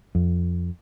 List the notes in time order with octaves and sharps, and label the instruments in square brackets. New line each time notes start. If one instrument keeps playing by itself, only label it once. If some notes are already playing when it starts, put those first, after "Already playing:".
[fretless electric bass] F2